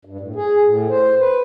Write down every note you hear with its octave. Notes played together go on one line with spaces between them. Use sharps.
G2
A2
G#4
A2
C5
B4